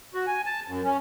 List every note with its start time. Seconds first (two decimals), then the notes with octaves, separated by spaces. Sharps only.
0.14 F#4
0.27 G#5
0.46 A5
0.68 F#2
0.85 C#4